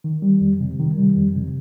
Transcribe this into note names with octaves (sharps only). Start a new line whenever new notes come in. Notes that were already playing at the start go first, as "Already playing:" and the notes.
D#3
G3
F2
C3
D#3
G3
F2
C3